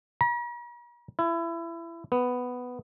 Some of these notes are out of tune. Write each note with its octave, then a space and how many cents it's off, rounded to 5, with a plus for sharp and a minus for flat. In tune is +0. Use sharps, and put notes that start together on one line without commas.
A#5 +45
E4 +25
B3 +5